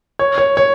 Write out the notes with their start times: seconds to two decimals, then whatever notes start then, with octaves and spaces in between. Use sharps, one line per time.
0.19 C#5
0.38 C#5
0.57 C#5